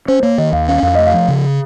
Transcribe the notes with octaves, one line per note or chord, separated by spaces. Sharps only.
C#4 C5
A#3 C#5
D#3 D#5
D#2 F5
C#4 F5
F2 F5
A3 D#5
F5
F3
C#3